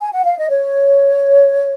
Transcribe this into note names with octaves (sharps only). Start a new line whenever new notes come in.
G#5
F#5
F5
D#5
C#5